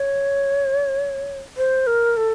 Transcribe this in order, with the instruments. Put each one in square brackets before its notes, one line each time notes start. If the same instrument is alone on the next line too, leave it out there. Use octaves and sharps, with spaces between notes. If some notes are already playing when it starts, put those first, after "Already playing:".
Already playing: [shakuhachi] C#5
C5
A#4
A4